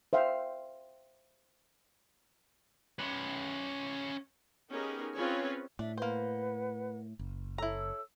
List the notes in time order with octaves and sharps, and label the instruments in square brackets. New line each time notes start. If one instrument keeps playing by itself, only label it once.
[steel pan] C5 E5 F5 G5
[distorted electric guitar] C#4 B4
[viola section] B3 C#4 D#4 G4 G#4 A#4
C4 C#4 F4 G#4 B4 C#5
[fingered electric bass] A2 [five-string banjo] D4 [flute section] E5
[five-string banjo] A#3 C5 [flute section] B4 F#5
[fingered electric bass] F#1
[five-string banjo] E4 A#5 [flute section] A4 C#5 E6